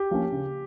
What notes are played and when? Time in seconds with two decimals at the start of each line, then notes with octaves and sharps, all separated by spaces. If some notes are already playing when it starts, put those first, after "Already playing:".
Already playing: G4
0.11 F3 A#3 C#4
0.32 C#3